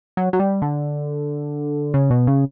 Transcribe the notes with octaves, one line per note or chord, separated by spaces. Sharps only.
F#3
F#3
G3
D3
C#3
B2
C#3